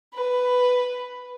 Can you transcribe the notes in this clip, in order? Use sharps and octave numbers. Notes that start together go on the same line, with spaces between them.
B4